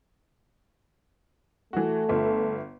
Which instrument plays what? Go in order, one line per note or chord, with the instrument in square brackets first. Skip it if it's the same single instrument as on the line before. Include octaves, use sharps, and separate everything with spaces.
[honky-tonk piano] E3 F#4 [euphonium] A3
[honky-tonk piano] G1 F4 E5